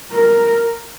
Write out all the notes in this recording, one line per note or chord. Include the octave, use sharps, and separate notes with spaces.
A#4